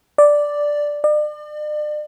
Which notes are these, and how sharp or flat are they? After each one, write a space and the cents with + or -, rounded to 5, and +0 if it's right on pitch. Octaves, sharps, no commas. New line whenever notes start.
D5 +0
D5 +40